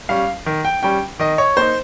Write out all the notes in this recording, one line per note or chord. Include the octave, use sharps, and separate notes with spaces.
G3 C#4 F5
D#3
G5
G3 C#4 G5
D#3 D#5
C#5
A#3 D#4 C5